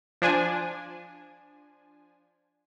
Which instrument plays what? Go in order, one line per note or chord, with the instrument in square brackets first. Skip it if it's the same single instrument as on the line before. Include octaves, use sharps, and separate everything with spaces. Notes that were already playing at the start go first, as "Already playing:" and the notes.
[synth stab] F3 D4 G#5